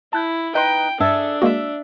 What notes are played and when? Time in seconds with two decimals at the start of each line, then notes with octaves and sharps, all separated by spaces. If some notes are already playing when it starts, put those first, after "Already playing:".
0.13 E4 A5 F#6 G6
0.55 D#4 B4 D#5 G5 C6 G6
1.00 G2 D4 G#4 A4 E5
1.42 G#3 A#3 F#4 E5 E6